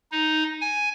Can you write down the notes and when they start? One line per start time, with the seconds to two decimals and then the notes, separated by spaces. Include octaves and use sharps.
0.12 D#4
0.61 G#5